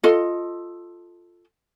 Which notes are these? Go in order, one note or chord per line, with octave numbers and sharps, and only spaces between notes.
F4 A4 D#5